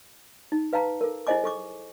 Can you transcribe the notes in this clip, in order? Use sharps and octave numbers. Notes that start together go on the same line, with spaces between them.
D#4
B4 F5 G5 A5 A#5
A4 A#4
E4 G#4 C5 D#5 G#5 D6
A4 C#6 D6